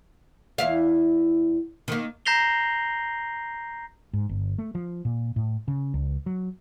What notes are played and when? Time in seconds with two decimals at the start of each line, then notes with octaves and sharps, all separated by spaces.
0.58 E2 E4 F5
1.88 D#3 A#3
2.26 A#5 G6 A#6 C7 F7 G7
4.13 G#2
4.29 G1
4.58 A3
4.75 F3
5.05 A#2
5.36 A2
5.68 C#3
5.94 C#2
6.26 F#3